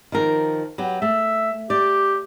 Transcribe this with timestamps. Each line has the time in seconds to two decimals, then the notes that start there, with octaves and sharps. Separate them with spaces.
0.12 D#3 F3 A#4
0.78 F#3 B3 G4
1.02 A3 E5
1.70 G4 D5